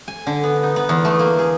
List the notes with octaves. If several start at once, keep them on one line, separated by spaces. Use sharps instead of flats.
G#5
D3
B3
D#4
B3
E2
A3
A#3
G#4